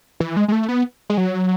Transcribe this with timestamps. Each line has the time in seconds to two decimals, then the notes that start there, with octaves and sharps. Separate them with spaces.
0.20 E3
0.37 G#3
0.48 G#3
0.52 A3
0.68 B3
1.10 G#3
1.18 F#3